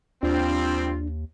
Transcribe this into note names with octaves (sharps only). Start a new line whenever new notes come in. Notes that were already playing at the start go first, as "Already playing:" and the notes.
D#2 F3 G3 C4 D4 F4